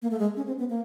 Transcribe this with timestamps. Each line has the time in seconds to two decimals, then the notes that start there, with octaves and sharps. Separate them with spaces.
0.02 A#3
0.11 A3
0.19 G#3
0.36 C#4
0.47 C4
0.59 B3
0.70 A#3